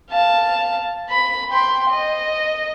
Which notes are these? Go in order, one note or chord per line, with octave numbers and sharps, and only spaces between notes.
F5 A5
B5
G5 C6
D#5